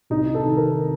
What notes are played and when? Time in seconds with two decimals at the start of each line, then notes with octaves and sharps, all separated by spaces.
0.10 C2 D#4
0.35 A4
0.46 C3 D#3
0.57 A#4